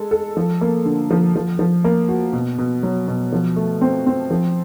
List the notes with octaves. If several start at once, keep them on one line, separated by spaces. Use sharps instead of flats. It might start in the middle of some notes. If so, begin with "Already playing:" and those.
Already playing: G#3 A4
A4
F3
A#3
D3
F3
F3
F3
A#3
F#4
B2
B2
F#3
B2
F3
A3
C4
C4
F3